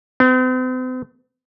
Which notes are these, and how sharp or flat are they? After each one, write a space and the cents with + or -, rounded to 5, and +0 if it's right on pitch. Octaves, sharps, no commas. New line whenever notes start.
C4 -45